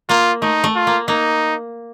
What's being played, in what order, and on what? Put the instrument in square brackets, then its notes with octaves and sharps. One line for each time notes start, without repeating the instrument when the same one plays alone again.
[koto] A#3 [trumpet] F4
[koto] A3 [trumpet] D#4
[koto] A3
[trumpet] F4
[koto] A#3
[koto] A#3 [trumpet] D#4